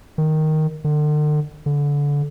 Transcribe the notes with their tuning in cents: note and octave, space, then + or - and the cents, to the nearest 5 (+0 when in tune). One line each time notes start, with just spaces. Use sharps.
D#3 +0
D3 +40
D3 -25